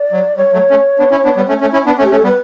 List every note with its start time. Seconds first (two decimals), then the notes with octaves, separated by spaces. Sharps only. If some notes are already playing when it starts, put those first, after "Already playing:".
Already playing: D5
0.12 F#3
0.37 G3 C#5
0.53 F#3 A3
0.70 A3 C#4
0.99 B3 D4
1.11 C#4 E4
1.24 B3 D4
1.36 G3 B3
1.48 A3 C#4
1.61 A3 C#4
1.73 C#4 E4
1.86 B3 D4
1.98 A3 C#4
2.03 G4
2.10 A3 C#4
2.14 A4
2.23 G3 B3 B4